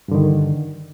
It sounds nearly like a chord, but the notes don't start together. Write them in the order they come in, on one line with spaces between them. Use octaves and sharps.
G2 D3 D#3